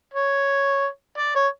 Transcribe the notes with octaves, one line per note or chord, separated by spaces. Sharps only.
C#5
D5
C#5